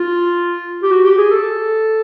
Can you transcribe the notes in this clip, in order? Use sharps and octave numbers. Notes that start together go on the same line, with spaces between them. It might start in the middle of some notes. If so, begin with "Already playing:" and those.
Already playing: F4
G4
F#4
G4
G#4
A4